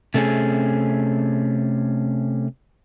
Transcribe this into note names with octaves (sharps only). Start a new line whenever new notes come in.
C3 A3 C4 C#4 G#4